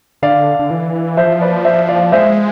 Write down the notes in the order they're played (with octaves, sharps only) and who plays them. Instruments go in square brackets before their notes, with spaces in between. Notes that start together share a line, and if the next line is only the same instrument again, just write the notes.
[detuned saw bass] D3 [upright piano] D5 F5
[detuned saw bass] D3
E3
[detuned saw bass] F3 [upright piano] C5 E5
[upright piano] B4 D5
C5 E5
D5 F5
[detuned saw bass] G#3 [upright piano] C5 E5